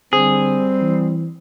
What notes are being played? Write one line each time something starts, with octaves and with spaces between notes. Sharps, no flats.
D3 G3 C4 G#4
E3